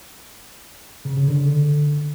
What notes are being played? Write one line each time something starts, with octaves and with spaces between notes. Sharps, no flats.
C#3
C#3
D3